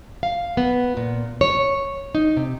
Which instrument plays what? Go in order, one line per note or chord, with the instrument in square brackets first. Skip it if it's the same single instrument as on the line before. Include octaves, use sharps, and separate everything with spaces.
[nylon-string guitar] F5
B3
A#2
C#5
D#4
C3